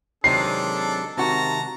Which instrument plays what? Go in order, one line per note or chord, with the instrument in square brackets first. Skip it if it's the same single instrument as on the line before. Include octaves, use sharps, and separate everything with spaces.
[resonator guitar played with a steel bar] C3 D#3 G#3 [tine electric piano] F#3 C4 [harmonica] D4 A4 [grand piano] C7
[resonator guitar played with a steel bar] G#2 F#4 [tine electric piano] C3 D#3 [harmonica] A5 A#5